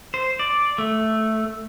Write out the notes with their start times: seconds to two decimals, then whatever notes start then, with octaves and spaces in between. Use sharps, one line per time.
0.14 C5
0.39 D5
0.78 A3